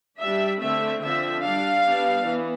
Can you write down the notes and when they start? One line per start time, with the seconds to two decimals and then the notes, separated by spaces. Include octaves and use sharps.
0.20 G3 D4 E5
0.61 D3 A3 C4 E5
1.02 D3 F3 C4 E5
1.43 G3 D4 F5
1.84 G3 B3 D4
2.25 E3 B3